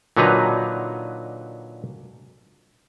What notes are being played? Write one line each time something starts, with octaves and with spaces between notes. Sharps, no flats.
A#2 D3 F#3 D#4 B4 A#5